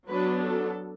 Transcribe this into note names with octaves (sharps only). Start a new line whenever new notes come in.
F#3 B3 D4 B4
A4